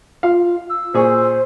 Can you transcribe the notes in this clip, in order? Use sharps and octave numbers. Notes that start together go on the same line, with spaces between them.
F4 F5
E6
A#2 G#4 C5 C#6